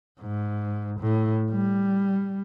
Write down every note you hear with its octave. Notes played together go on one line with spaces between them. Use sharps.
G#2
A2
G3